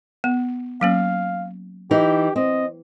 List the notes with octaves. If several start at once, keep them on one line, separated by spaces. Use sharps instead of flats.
B3
F#3 A#3 C#4 F5
E3 D#4 G4
C4 D#5